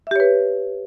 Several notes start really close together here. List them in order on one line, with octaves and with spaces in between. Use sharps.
E5 G4 C#5 B4